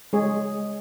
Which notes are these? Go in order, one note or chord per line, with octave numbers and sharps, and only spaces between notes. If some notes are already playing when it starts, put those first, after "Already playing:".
G#3 G#4 C#5